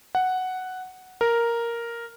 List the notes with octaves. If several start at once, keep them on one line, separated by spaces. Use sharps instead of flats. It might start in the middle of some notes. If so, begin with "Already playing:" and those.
F#5
A#4